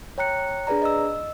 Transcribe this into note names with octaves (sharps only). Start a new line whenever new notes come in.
C#5 G5 A#5 F#6 C#7
D4 G#4 B4 D5 A#5
D#5 E6